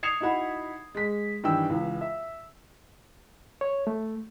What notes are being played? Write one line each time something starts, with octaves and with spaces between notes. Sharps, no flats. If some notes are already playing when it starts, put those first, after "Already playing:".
D#6 G#6 C7 C#7 E7 F7
D#4 E4 F#4 F#5 B5
G#3 B6
G2 D#3 E3 G5 E6
C#2 E3
E5
C#5
A3